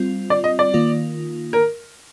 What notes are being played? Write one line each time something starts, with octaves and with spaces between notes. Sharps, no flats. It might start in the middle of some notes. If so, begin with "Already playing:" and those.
Already playing: G3 C4 F4
D5
D#5
D5
D#3 A#3 F4
A#4